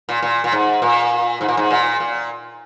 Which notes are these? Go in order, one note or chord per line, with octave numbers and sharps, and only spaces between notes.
A#2
A#2
A#2
G#2
A#2
G#2
A#2
G#2
A#2
A#2